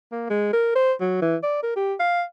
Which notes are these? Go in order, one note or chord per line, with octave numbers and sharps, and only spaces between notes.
A#3
G#3
A#4
C5
F#3
E3
D5
A#4
G4
F5